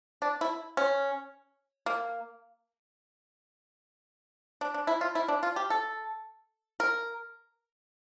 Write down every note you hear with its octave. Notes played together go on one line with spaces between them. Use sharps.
D4
E4
C#4
A#3
D4
D4
E4
F4
E4
D4
F4
G4
A4
A#4